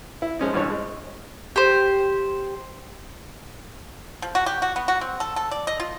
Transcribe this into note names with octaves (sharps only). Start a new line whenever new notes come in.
E4
F3 G#3 C#4 D#4
A1 G2 E3 C#5
G#3
G4 C5
F3
F#4
G4
F#4
B3
F#4
C4
A4
A4
D5
D#5
F4